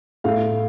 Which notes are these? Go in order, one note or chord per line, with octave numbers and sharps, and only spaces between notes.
A2 A3 F5